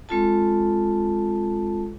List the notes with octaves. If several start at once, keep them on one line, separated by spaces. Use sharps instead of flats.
G#3 C4 F4 A4 A5